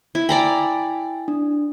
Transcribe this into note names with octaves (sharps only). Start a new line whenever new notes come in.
E4
D5 G5 G#5 A#5 B5
D4